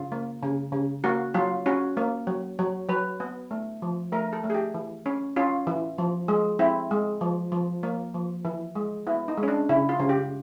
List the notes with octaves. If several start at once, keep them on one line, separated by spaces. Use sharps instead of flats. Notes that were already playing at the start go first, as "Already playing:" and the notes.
Already playing: C#3 F4
A#3
C#3
C#3
A#3 F#4
F#3 F4
C#4 F#4
A#3
F#3
F#3
F#3 B4
B3
A3
F3
A3 A#4
A4
A3
G#4
G4
E3
C#4
C#4 F4
E3
F3
G#3
C4 E4
G#3
F3
F3
A#3
F3
E3
G#3
B3 E4
D#4
G#3
C#4
D4
C#3 E4
F4
C#3
G4